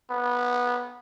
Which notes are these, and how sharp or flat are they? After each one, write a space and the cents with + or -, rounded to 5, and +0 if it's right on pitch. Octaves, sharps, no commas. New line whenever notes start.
B3 -15